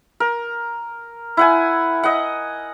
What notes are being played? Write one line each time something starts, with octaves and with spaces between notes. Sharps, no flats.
A#4
E4 F#5 G#5
D#5 F#5